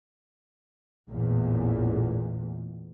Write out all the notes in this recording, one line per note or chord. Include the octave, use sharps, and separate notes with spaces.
A1 E2 A#2